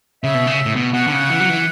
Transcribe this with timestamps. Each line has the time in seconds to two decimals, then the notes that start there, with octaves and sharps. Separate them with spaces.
0.23 C#3 E5
0.34 B2
0.47 C#3
0.66 A2
0.76 B2
0.93 B2 F#5
1.07 D3
1.12 C#3
1.30 E3
1.40 F#3
1.49 E3